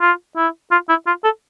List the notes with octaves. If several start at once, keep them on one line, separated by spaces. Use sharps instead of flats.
F4
E4
F4
E4
F4
A4